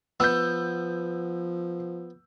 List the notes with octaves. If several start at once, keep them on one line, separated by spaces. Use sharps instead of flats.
F3 B3 E6 G6